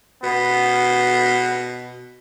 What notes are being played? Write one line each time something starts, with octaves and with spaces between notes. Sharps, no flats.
B2 B3